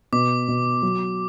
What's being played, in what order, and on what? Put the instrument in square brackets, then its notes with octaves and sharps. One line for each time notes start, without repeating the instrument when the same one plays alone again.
[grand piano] B2 [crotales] D6
[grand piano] B2
F#3